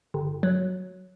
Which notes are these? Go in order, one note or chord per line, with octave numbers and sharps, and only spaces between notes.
G1
F#3